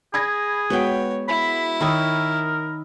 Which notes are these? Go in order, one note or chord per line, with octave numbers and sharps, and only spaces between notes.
G#4 B5 G#6 A#6
G#3 B3 F#4 B4 C#5 G5
E4 B5
D#3 A#4 C#5 B5 D#6 E6